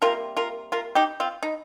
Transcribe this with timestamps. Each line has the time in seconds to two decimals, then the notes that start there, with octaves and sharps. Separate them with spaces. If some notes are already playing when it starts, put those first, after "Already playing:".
0.02 C3 G3 A#3 F4 A#4
0.37 F4 A#4
0.72 F4 A#4
0.95 D#4 G4
1.20 C4 F4
1.43 D#4